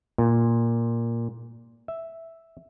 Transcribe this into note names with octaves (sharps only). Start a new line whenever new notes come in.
A#2
E5